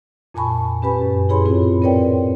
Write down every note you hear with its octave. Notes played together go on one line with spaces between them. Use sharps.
F2 A#2 G#5 A5 B5 C#6
C#4 G4 B4 G#5 B5
F#2
E4 G#4 C#5 B5 C6
A2 C4 F4
C4 A#4 B4 C#5 D5 G5